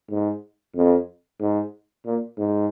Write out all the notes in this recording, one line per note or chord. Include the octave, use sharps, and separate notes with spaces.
G#2
F2
G#2
A#2
G#2